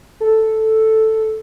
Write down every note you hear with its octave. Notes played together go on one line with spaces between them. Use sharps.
A4